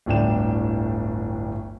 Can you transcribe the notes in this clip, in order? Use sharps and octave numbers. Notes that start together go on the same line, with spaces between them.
D1 G1 A2 D4 G5 E7